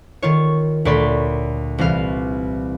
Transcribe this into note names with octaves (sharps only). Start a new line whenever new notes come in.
D#3 F4 C#5
D2 A#2 C#5 D5 B5 C6
C2 E3 F4 F5 F6